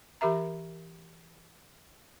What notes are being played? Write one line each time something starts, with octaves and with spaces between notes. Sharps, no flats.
E3 G4 A#4 E5 A#5